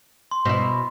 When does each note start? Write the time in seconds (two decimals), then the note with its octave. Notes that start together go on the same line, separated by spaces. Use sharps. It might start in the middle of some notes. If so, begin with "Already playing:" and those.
0.31 C6
0.45 B2 E4